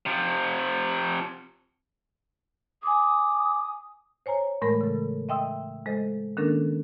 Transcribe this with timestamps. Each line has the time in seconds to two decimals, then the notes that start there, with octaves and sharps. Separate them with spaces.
0.06 C3 F3
2.83 G#5 D6 D#6
4.26 C5 C#5 G#5 A#5
4.62 A2 E3 G#3 A3 A#4 B5
4.81 C#3 A4
5.29 D#5 E5 G5 C6 D#6 E6
5.86 G#3 A4 C5 D#5
6.37 D#3 A#3 C#4 D4 A4 A#4